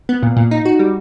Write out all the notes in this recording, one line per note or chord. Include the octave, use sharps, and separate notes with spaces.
B3
A#2
A#2
D#4
F#4
G3